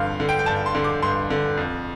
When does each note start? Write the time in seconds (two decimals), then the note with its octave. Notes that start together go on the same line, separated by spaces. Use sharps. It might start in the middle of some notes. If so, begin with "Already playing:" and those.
Already playing: G2 D3 F5 C6
0.20 D3
0.29 G5
0.39 G5
0.46 G2 A5
0.66 C6
0.75 D3
0.84 D6
1.02 G2 C6
1.30 D3
1.57 F2